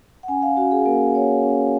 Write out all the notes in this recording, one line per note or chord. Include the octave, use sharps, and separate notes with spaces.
F#5
C#4 G#5
F5
C#4 F#4
G#4
A#3 A#4
A#3 C#5
C#4